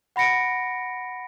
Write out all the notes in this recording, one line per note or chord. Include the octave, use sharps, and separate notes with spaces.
F#5 B5 A#6 C#7 D7